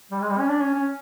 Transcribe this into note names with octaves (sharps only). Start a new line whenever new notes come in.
G3
G#3
G3
C#4
D4
C#4
C#4